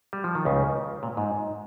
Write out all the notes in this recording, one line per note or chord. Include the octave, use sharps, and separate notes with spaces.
G3
F3
D#3
C#2 C#3
A#2
G#2